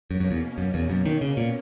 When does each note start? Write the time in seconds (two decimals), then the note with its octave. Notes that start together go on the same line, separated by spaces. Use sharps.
0.10 F#2 B2 A#3 C#4
0.20 F#2
0.31 E2
0.58 F#2
0.74 E2
0.90 F#2
1.06 D#3
1.21 C#3
1.37 A#2